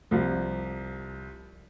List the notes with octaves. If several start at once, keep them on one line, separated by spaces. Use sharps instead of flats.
C2 F3